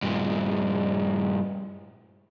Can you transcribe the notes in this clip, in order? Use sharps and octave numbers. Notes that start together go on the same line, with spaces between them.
G2 A#2